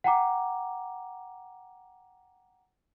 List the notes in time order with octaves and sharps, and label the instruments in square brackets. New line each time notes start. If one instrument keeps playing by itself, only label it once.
[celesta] F#5 G5 A#5 D6